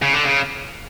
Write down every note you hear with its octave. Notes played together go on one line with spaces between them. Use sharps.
C#3
D3
C#3